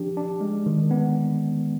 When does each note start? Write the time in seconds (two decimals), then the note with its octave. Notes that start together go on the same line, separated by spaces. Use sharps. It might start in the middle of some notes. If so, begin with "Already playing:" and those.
Already playing: F3 D4 G4
0.17 D4
0.41 G#3
0.66 D#3
0.91 B3